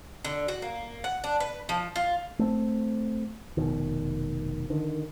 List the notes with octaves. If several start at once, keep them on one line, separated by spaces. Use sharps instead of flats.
D3
F#4
A#3
F#5
D4
B4
F3
F4
A3 C4
F1 B2 D#3
D3 D#3